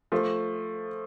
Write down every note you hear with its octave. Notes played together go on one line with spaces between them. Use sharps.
F3 A3